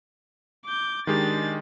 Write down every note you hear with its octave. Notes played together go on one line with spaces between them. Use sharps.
D6 G6
D#3 G#3 D4 G4 A6